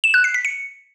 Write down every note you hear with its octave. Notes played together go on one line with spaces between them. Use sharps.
E7
F#6
C7
B6
C#7